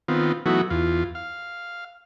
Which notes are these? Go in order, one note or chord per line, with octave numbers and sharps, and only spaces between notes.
D#3 B3 C4 F4
E3 F#3 A3 B3 D#4 F#4
E2 F4
F5